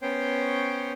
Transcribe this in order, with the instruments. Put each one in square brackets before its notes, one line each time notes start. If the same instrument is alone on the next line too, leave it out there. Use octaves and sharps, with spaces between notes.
[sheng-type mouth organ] B3 C#4 C5 C#5 G5